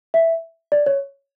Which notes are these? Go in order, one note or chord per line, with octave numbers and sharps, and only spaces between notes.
E5
D5
C#5